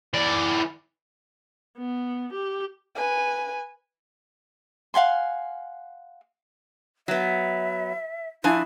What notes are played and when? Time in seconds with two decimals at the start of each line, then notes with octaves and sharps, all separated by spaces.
0.14 E3 D5
1.78 B3
2.33 G4
2.95 B4 G#5
4.94 F5 F#5 G#5 C6
7.08 F#3 B3 E5
8.44 F3 D4 E4 G#5